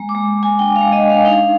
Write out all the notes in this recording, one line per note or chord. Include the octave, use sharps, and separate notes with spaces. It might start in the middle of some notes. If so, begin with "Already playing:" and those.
Already playing: G#3 A#3
D6
G#3
G#3
G#5
D4 G5
F5
G#3
D#5
D4
F5
D#4 F5